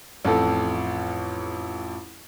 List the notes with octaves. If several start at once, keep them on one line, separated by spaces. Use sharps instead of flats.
A1 F2 A4